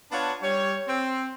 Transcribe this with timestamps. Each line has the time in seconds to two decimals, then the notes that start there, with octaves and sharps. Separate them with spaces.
0.12 B3 D4 F4 C#5 F#5 A5
0.43 G3 C#5
0.87 C4